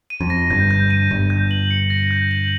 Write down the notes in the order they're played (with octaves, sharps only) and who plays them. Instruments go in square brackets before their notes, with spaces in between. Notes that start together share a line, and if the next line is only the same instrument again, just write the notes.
[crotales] D#7
[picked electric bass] F2
[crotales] A#6
[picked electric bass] G1 G2 [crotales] G6
[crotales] G6
D#7
[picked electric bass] G1 G2 [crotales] A#6
[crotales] G6
F#7
C#7
A#6
G6
F#7